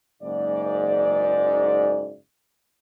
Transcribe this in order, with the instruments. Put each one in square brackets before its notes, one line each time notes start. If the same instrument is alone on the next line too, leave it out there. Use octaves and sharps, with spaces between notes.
[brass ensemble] F#1 G#2 D5